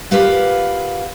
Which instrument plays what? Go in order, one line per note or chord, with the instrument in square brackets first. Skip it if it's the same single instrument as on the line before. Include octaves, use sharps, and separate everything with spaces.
[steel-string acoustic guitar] F4 G4 A#4 B4 F5 F#5